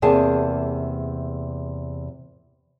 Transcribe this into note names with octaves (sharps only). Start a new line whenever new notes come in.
E2 C3 A#3 G#4 A5